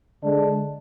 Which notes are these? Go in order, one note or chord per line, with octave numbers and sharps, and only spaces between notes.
D3 G#3 D4